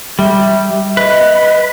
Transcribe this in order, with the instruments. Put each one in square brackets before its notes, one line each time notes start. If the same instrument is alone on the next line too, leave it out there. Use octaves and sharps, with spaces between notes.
[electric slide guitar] G3 [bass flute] E5
[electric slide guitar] B4 [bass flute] D#5